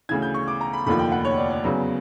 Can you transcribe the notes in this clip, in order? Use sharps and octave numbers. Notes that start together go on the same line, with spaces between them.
D2 C#3 E3 G#6
G6
C#6
D6
A#5
B5
F1 D#2 D3 F3 B5
G5
F#5
C#5
D5
D5
E2 C#3 F#3 B3